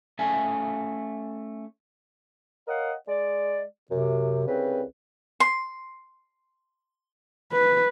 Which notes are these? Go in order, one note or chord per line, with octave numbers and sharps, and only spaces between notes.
A3 C#4 A4 E5 F5 G#5
A#4 C#5 D#5 F5 F#5
G#3 D5
F#2 C3
C2 C#3 C4 B4
C6
B4